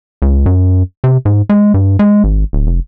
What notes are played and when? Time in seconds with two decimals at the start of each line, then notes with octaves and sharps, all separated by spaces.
0.22 C#2
0.46 F#2
1.04 C3
1.25 G#2
1.49 G#3
1.74 G2
1.99 G#3
2.24 G#1
2.53 D1
2.67 F1